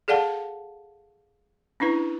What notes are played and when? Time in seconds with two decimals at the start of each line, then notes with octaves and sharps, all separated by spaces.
0.08 G#4 A4 D5 F5 F#5 A5
1.80 C#4 D4 E4 B4